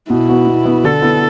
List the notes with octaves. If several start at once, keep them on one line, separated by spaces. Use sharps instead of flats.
B2 E4
B3 F#4
B2
B3 F#4
D3 A4
B3 E4